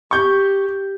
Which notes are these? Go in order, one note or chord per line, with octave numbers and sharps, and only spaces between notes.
G4 C#6 G6